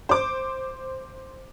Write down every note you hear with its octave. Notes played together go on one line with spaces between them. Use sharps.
C5 D6